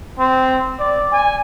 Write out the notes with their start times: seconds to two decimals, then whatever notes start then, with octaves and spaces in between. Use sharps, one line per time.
0.19 C4
0.79 D5
1.12 G#5